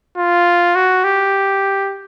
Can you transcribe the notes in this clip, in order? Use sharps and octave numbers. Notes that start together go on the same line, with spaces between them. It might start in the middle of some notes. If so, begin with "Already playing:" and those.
F4
F#4
G4